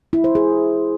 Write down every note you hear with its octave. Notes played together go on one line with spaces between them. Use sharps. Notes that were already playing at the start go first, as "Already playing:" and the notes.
E4
C5
G#4